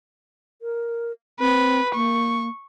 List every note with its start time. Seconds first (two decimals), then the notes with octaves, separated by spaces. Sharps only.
0.62 A#4
1.40 C4 B4
1.95 A#3 C#6